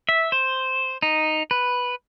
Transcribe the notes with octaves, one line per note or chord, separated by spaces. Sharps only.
E5
C5
D#4
B4